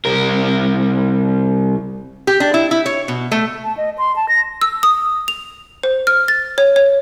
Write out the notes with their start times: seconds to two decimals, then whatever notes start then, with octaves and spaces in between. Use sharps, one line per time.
0.05 C2 A#4
2.27 G4
2.40 D4
2.54 E4
2.71 E4
2.86 C#5
3.08 B2
3.32 A3
3.64 A5
3.77 D#5
3.98 C6
4.16 A5
4.29 A#6
4.62 E6
4.83 D#6
5.28 F7
5.83 C5
6.07 F6
6.28 A6
6.58 C#5
6.76 C#5